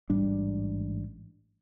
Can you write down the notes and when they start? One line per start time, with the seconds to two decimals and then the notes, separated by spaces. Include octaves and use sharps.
0.10 A1 G#2 G3 D4